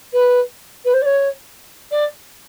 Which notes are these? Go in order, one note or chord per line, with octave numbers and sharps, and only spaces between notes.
B4
B4
C5
D5
C#5
D5